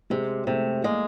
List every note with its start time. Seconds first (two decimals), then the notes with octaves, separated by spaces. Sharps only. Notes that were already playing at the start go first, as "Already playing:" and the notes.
0.10 C3 G#3
0.47 C3 A3
0.84 G#3 A#3